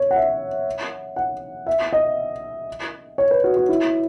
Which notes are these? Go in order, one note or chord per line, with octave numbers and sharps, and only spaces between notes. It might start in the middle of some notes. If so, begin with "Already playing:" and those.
Already playing: C#5
F#5
E5
F#5
E5
D#5
C#5
B4
F#4
F#4
E4